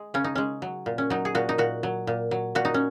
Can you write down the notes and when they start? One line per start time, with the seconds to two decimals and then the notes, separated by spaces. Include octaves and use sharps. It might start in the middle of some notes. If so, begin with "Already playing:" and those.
Already playing: G#3
0.14 C#3 C#4
0.24 D#4
0.35 G#3 C#4
0.62 F#3
0.86 A#2
0.98 C#4
1.10 F#3 D#4
1.25 G#4
1.35 A#2 F#4
1.49 D#4
1.58 A#2 F#4
1.83 F#3
2.07 A#2
2.31 F#3
2.55 A#2 F#4
2.65 D#4
2.74 C#4